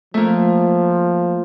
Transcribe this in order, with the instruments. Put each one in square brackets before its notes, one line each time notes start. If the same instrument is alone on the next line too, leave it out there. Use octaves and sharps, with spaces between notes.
[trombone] F3 [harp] A3 A#3